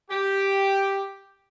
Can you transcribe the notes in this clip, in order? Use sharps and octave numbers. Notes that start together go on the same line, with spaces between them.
G4